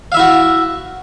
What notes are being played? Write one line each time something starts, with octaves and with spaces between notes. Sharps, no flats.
E4 F#4 E5 F5